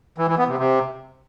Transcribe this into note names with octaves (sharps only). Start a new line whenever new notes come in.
E3
E3
B3
C3
C3